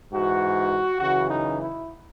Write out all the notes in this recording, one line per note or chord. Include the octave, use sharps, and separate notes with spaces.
G#2 E3 F#4
F#2 C#3 E3 F#4
D#4
E4